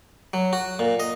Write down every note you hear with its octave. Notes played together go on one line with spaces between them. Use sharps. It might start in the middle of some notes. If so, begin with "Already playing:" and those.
F#3
F#4
A#2
D#5